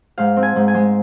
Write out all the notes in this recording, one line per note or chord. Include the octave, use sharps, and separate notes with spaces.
G#2 F5
C4
G#5
G#2
G#5
G#3